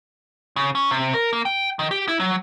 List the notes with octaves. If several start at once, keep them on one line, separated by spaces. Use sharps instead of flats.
C#3
C#4
C3
A#4
A#3
G5
D#3
G4
E4
F#3